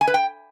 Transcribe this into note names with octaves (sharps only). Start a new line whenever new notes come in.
G#5
B4
G5